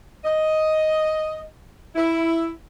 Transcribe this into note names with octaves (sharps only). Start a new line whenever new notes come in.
D#5
E4